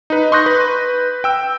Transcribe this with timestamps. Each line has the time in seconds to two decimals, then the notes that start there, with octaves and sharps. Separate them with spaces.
0.10 D#4 B4
0.32 C6 C#6 D#6 F#6 G6 A#6
0.46 B4
1.24 G5 E6